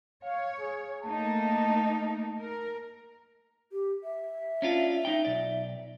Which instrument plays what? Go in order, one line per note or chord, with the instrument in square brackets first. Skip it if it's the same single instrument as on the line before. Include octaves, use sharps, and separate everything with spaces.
[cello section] C#5 [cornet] F5
[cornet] G#4
[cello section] A3 A#3 D#4 [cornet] A5
[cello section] A#4
[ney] G4
E5
[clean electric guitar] C#4 D4 F4
D#4 G5
B1 D5